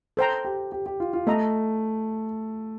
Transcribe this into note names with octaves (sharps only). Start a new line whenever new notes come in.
A4 C5 G5 A#5
G4
G4
G4
F4
F4
A3 A4 D#5 A#5